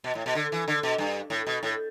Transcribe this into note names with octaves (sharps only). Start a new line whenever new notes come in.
B2
A2
B2
D3
E3
D3
B2
G2
A2
B2
A2